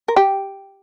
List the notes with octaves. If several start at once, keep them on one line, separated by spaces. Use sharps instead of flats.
A#4
G4